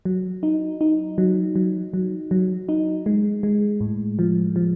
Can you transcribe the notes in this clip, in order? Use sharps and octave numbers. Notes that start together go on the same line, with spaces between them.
F#3
D#4
D#4
F#3
F#3
F#3
F#3
D#4
G#3
G#3
A2
F3
F3